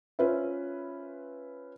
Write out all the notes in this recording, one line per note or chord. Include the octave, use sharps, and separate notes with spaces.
C#4 F4 B4 C5 E5